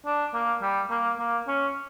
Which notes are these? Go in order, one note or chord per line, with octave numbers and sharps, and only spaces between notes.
D4
A#3
G3
A#3
A#3
C#4